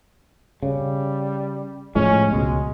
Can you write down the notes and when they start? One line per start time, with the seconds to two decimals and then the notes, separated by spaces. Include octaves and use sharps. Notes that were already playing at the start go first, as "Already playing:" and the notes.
0.63 C#3 G3
1.95 A2 F3 G#3 C#4
2.31 C#2 B2 G#3